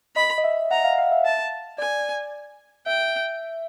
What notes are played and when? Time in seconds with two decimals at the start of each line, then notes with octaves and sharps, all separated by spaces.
0.16 D#5 B5
0.38 D#5
0.44 E5
0.71 F#5 A#5
0.84 F5
0.98 F5
1.11 E5
1.25 A5
1.78 D5 G#5
2.86 E5 G5